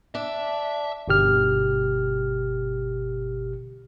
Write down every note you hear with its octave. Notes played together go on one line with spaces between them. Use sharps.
D4 E5
G1 B2 G4 F6